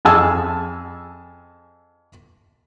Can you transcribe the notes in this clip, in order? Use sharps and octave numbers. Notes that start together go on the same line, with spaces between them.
F2 G#4 G#5 A5 E6